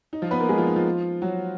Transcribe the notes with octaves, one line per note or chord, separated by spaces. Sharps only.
D#4
F3 F4
B3 B4
A#3 A#4
G#3 G#4
F3 F4
D#4
F3 F4
F#3 F#4